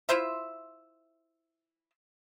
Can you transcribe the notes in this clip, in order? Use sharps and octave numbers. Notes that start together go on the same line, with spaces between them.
E4 F4 C5 E5